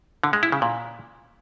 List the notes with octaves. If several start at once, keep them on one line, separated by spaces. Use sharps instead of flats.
D3
G#3
E4
C#3
A#2